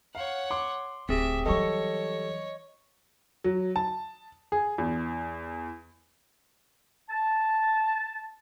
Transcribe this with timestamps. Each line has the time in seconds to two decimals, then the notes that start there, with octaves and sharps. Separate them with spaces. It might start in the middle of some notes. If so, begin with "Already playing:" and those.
0.15 C#5 F5 F#5
0.51 C6 D6
1.09 D1 C4 G4 G#4 E5
1.46 E3 F#3 G3 A4 C#5 D#5 C#6
3.44 F#3
3.76 A5
4.52 G#4
4.78 E2
7.09 A5